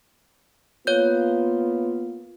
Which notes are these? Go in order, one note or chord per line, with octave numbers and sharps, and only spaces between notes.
A#3 B3 F4 C#5 G6